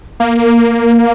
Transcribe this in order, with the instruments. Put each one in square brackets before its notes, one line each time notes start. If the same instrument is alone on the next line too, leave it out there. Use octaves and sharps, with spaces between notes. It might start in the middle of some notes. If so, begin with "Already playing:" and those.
[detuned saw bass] A#3